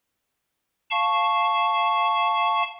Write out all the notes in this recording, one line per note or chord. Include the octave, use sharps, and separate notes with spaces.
F5 A5 C#6